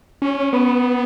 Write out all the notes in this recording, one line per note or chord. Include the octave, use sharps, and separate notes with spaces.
C#4
B3